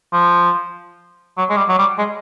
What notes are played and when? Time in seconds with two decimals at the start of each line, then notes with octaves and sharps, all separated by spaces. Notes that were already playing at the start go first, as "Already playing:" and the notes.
0.13 F3
1.37 F#3
1.50 G#3
1.57 G3
1.69 F#3
1.79 G3
1.98 G#3